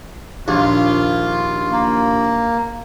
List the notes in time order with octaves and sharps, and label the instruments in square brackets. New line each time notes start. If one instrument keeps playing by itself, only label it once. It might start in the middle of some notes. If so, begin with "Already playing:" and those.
[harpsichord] A#1 D#2 [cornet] F4
[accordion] A#3